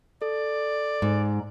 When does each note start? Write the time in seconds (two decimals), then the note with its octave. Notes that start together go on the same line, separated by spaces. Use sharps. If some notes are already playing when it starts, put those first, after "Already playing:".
0.22 A4 D5
1.02 G#2